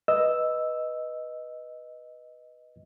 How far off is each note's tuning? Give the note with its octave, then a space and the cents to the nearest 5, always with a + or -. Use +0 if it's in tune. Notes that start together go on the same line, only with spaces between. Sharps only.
B4 -5 D#5 +0 E6 +0